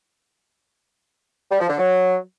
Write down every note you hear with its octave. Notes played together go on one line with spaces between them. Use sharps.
G3
F3
D3
F#3